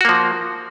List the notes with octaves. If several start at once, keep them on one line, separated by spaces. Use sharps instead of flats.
F3 A#3 F#4